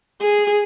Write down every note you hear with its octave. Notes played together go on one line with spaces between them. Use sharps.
G#4